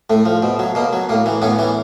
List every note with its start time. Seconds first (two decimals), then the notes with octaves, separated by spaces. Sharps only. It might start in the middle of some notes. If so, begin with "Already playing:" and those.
0.10 A2 A3
0.25 F3
0.43 B2
0.59 F#3
0.75 B2 A#3
0.93 F#3
1.09 A2 A#3
1.26 E3
1.42 A2 B3 C#4
1.59 E3